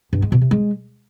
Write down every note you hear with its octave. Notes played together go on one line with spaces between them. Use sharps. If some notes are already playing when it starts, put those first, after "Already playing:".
G2
G#3
B2
C3
G#3